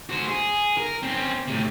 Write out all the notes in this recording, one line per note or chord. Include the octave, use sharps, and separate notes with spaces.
F#4 C5
G#4
A#4
C4 C#4
A2 C3